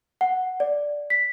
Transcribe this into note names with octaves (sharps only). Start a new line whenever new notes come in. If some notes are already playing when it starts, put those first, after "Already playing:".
F#5
D5
B6